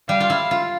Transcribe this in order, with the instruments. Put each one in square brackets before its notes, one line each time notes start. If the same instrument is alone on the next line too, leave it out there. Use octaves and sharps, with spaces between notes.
[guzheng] G3 [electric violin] F5
[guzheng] F4
E4
F4